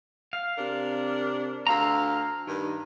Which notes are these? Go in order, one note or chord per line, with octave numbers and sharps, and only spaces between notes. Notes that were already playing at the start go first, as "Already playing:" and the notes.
F5
C3 D4 A#4
D2 F5 A#5 E6
G2 D#3